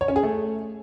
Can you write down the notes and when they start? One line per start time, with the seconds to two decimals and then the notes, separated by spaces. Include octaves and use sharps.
0.01 C#5
0.08 C#4
0.16 G#4
0.23 A3